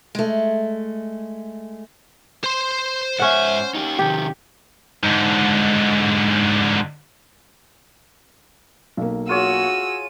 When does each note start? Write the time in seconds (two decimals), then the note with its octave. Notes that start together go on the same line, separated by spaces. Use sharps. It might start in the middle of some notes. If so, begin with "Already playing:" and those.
0.15 G#3 A3
2.44 C5 C6
3.19 G#2 C#4 E5 F#5
3.75 D#4 G4
3.99 C3 D#3 G4
5.03 G#2 D3
8.97 B1 A#3
9.29 F4 F#4 G#4 C#5 E6 D#7